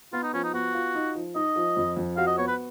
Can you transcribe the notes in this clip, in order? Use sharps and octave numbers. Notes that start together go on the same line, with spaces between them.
B3 F4
D#4
F3 C#4
D#4
B3 F#4
F4
D#4
F3
D#4 D#5
F3
F2
F2
F#4 F5
D#5
B3 C#5
B4